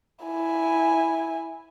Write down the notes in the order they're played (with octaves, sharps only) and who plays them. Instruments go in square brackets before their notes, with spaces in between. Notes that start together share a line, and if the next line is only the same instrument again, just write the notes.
[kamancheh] E4 G#5